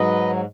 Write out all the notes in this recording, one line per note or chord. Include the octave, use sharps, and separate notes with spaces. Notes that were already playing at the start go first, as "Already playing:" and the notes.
Already playing: G#2 F#3 B4 D#5